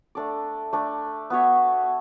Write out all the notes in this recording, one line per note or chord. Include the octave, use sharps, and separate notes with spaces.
A3 D4 A4 D5
A3 D4 A4 D5
B3 F#4 C#5 E5